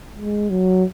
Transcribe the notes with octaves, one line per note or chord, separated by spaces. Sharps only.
G#3
F#3